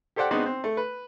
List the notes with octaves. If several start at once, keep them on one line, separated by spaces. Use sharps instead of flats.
G4 A4 C5 D5 F#5 G5
G#3 B3 C4 D4 D#4 F#4
C4
A3
B4